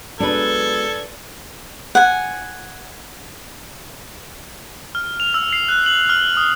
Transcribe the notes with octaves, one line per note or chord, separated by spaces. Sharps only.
F#3 G#3 B3 D4 A4 B4 G#6
F#5 G#5
F6
F7
E6
C7
F#6
F#7
F6
D#6